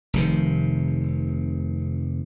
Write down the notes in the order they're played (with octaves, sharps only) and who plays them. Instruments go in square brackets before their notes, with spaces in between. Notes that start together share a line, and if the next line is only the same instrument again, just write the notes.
[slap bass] F1 C3 D#3